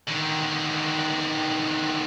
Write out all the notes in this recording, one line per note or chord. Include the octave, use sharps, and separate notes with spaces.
D3 D#3